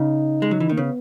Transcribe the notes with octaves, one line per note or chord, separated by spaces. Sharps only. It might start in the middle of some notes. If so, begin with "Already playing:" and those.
Already playing: C#3 D#4
G#3
F#3
E3
D#3 A#3
C#3 B3